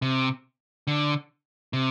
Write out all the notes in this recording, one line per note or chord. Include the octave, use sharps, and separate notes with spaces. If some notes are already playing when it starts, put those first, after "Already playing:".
C3
D3
C3